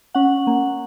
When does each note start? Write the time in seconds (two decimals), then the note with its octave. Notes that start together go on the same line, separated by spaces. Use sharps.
0.15 C#4 F#5
0.47 A#3